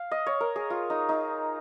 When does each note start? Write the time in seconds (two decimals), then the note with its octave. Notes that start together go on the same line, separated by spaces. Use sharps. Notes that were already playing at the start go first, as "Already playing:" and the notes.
Already playing: F5
0.11 D#5
0.27 C#5
0.41 A#4
0.56 G#4
0.70 F4
0.90 D#4
1.09 D#4